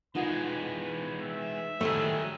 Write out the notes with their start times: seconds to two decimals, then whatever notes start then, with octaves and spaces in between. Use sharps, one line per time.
0.15 E3 G#3 D#4 F4 F#5 B5
1.20 E5
1.81 A2 D#3 F#3 G3 A3 G#4